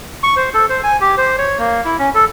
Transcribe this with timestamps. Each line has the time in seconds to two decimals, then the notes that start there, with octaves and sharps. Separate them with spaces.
0.23 C#6
0.37 C5
0.54 A4
0.70 C5
0.84 G#5
1.01 G4
1.18 C5
1.38 C#5
1.58 A#3
1.85 E4
1.99 C#4
2.15 A4